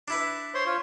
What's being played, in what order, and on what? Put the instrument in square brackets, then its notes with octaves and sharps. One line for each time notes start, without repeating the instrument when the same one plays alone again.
[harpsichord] D4 E4 B4
[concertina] C5 C#5 C6
F4 C#5